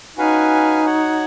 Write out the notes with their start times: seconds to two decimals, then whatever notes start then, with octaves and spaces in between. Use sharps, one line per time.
0.17 C#4 D#4 F#4 B4 F5 G#5
0.85 F#4 C#5 F#5